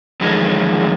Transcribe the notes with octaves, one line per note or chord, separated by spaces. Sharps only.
F2 D3 D#3 F#3 G#3